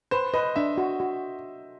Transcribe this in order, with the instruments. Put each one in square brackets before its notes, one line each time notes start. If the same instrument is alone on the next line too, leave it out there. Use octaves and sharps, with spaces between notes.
[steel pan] B4 [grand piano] C5
[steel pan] B4 [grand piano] D#5
[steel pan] D4 [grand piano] E5
[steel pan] F#4
F#4